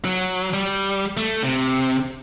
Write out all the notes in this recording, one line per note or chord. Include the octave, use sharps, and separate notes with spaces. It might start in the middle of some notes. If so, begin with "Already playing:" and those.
F#3
G3
A3
C3